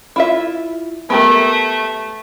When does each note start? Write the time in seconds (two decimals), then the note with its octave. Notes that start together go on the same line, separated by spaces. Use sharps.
0.16 E4 F4 E5
1.10 A3 B3 G4 A#4